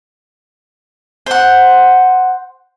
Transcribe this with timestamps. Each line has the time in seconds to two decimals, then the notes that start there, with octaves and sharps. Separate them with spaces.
1.26 C5 F#5